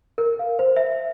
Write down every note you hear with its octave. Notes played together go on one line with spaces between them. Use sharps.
A#4
F5
C5
E5